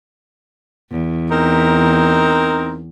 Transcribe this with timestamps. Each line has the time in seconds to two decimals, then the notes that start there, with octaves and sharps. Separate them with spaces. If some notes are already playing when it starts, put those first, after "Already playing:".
0.91 E2
1.31 C4 D#4 A#4